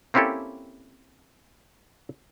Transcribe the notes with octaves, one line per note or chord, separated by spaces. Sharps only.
A#3 C4 C#4 E4 G4 A4